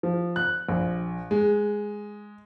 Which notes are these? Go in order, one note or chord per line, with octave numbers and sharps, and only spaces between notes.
F3
F#6
A#1
G#3